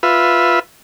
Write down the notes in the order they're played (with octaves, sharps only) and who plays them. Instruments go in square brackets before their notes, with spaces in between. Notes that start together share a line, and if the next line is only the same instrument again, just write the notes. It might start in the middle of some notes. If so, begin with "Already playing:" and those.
[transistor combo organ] F4 B4 E5